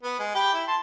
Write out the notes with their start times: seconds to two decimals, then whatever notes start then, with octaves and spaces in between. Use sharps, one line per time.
0.03 B3
0.19 G#3
0.35 G4 G5 B5
0.53 E4
0.67 A5 C6